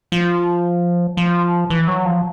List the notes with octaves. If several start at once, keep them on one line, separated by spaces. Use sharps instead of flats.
F3
F3
E3
F#3
F3